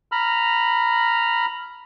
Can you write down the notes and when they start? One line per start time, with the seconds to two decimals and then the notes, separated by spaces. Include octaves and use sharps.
0.12 A#5 B5 F6